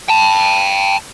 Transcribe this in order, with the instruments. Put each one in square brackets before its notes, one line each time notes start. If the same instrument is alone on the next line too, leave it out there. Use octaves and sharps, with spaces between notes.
[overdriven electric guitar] G5 A5